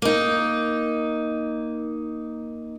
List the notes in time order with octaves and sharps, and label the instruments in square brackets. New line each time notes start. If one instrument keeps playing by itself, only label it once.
[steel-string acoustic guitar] A#3 D#4